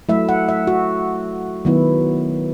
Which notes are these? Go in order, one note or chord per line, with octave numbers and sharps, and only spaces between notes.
F#3 A3 E4 E5
F#5
E5
F#4
D#3 F#3 B3 E4